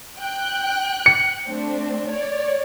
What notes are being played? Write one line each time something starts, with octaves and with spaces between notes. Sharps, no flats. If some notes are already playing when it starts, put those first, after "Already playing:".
G5 F#6
C#7
A3 C4 D4
C#5 D5